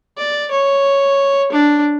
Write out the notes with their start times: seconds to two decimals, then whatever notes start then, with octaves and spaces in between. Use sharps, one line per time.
0.18 D5
0.51 C#5
1.52 D4